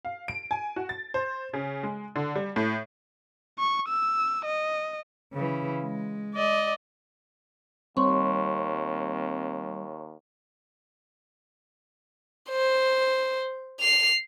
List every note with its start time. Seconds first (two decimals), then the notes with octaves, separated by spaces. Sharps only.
0.05 F5
0.28 D7
0.51 G#5
0.76 F#4
0.89 A6
1.14 C5
1.53 C#3
1.83 G#3
2.16 D3
2.35 G3
2.56 A2
3.59 C#6
3.88 E6
4.45 D#5
5.33 C#3 E3
5.84 G#3
6.35 D5 D#5
7.97 D#2 G3 C4 C#5 C6 C#6
12.51 C5
13.80 C7 F7